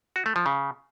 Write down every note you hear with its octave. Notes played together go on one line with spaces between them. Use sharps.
F#4
A3
F3
C#3